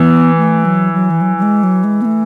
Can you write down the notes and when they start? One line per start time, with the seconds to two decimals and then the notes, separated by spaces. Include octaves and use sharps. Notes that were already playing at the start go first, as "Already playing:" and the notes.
Already playing: E3 B3
0.37 A3
0.65 F#3
0.93 F#3
1.10 E3
1.21 F#3
1.38 F#3
1.42 G#3
1.63 F#3
1.84 G#3
2.02 B3
2.05 A3